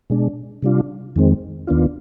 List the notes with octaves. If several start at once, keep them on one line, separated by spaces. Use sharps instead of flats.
B2 G#3 D4
C3 G3 D4 F4
F2 D#3 G#3 C4
D#2 D#3 B3 D4 F4